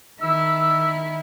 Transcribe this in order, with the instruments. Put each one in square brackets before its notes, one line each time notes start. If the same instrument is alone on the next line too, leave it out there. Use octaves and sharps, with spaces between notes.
[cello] D#3 E4 [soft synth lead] E6